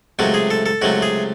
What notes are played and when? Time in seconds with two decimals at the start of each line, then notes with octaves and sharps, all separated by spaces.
0.19 C#2 C3 F#3 A3 F#4
0.34 G#4
0.51 A4
0.66 A4
0.82 C#2 C3 F#3 A3 F#4
1.02 G#4